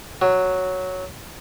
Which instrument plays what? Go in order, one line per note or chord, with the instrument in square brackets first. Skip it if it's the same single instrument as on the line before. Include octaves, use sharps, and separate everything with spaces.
[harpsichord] F#3